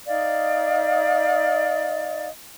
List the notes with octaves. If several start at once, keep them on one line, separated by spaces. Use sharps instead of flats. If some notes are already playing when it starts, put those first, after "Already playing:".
D#4 D5 D#5 F5